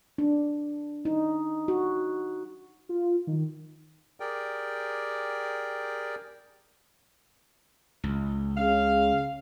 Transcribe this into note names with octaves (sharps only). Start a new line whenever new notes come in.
D4
D#4
F#4
F4
D#3
G4 G#4 A#4 D5 G5
C#2
C#3 F5